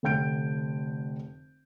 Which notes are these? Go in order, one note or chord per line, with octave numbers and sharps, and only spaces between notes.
F1 D3 G5 G6 D7